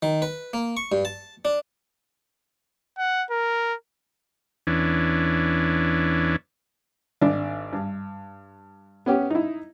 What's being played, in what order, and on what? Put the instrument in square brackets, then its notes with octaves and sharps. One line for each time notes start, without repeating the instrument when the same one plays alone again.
[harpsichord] D#3
B4
A#3
C#6
G2
A5
D4
[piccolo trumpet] F#5
A#4
[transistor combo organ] E2 E3 C#4 D4
[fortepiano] G#1 D4
G2
B3 C#4 G4
D#4 E4